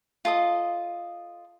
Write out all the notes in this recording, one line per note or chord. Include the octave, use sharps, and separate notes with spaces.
F4 A4 D#5 D#6